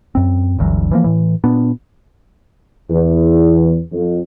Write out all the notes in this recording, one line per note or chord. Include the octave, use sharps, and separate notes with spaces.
F#2 C4
G1 D2 E3 F#3
E3 F3 A#3
A2 E3
A#2 B3 D4
E2
F2